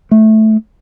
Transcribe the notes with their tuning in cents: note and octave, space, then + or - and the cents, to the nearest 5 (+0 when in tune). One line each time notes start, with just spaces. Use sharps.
A3 -10